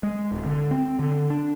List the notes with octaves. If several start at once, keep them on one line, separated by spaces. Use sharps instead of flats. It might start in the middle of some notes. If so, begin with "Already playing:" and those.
G#3
D1
D3
C4
D3
D4